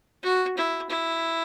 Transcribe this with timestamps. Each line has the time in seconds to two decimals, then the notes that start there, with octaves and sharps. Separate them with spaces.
0.23 F#4
0.57 E4
0.89 E4